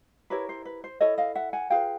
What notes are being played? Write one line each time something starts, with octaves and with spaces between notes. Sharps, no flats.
E4 G4 A#4 B4 C#5
C5
B4
C5
E4 A4 C#5 D#5
D#5 F5
E5 F#5
F#5 G#5
F4 G#4 B4 F5 G5